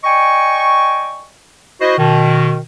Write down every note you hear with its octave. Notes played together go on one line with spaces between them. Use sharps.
D5 D#5 G5 G#5 C#6
E4 F#4 C5 D#5
B2 D#3